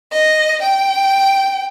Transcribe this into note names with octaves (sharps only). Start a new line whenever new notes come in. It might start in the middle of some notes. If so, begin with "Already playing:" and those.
D#5
G5